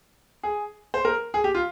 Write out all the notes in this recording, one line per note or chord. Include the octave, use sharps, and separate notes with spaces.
G#4
C5
A#4
G#4
G4
F4